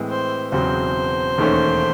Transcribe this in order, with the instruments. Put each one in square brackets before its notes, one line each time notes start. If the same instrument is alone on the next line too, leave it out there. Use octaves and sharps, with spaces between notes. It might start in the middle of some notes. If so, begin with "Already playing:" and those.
Already playing: [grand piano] A2 E3 G#3 C4
[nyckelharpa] C5
[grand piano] E1 E2 C#3 F#3 C4 [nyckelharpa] C5
[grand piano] E1 D#2 D#3 A3 C#4